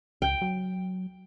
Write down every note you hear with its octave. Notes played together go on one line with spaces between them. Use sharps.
C#2 G5
F#3